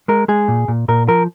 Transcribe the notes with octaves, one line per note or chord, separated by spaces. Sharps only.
G#3 A#4
G#3 G#4
A#2
A#2
A#2 A#4
F3 A#4